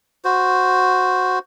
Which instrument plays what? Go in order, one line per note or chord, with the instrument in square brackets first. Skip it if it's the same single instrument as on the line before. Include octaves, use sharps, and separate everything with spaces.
[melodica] F#4 C5